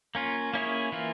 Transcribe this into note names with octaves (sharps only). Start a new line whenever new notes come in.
A#3 C#4 F4
A#3 C#4 E4 G#4 C#5
E3 A#3 F4